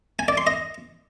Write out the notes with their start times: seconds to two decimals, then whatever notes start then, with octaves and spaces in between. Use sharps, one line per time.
0.19 G#5
0.28 D5
0.38 C6
0.47 D#5